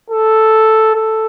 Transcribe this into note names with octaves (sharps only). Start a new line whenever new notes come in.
A4
A4